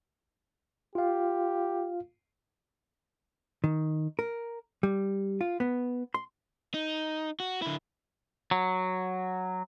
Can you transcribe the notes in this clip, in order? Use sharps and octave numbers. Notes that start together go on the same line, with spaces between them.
F4 G4 F5
D#3
A#4
G3
F4
B3
C6
D#4
F#4
D3 E4
F#3